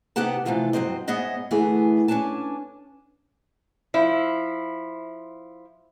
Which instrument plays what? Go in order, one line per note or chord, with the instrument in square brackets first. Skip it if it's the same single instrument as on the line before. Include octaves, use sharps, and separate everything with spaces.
[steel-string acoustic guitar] C3 B3 D#4 G4 F#5 A5
C3 E3 F3 A3 F4 A4
G2 F#3 C4 C5 D#5
G#2 B3 G#4 C#5 D#5 E5
D2 E3 A3 B3 G#4
C#4 D4 B4 G#5 A5
[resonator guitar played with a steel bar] F3 E4